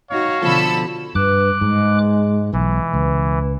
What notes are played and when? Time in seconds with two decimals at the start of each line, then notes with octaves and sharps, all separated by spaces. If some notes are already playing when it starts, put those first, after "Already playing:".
0.11 D#4 F#4 C#5 F5
0.42 B2 D3 F3 A4 B5 E6
1.15 G2 B4 D6 F#6
1.61 G#2 G#3
2.53 B1 E3
2.94 C#2 B4